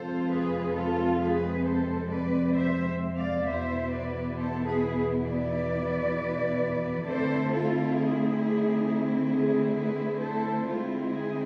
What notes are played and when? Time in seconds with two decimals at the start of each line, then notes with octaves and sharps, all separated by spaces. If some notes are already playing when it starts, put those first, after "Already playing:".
Already playing: F2 C3 G#3 C4 F4 A4 C5
0.31 G#4 B4
0.76 F4 A4
1.21 G#4 B4
1.65 A4 C5
2.11 B4 D5
2.56 C5 E5
3.16 D5 F5
3.46 E2 B2 B3 E4 C5 E5
3.91 B4 D5
4.37 A4 C5
4.66 G#4 B4
5.27 B4 D5
7.07 D3 A3 C4 E4 A4 C5
7.52 F4 A4
7.96 G#4
8.42 G#4
9.32 G#4
9.77 G#4 B4
10.22 A4 C5
10.67 D3 G#3 C4 E4 F4
11.12 G#4